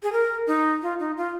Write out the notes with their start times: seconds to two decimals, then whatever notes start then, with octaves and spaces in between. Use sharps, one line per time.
0.03 G#4
0.12 A#4
0.47 D#4
0.82 F4
0.99 D#4
1.17 F4